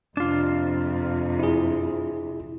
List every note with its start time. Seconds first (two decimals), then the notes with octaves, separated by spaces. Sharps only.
0.17 F2 C3 D4 F4
1.40 E4 G#4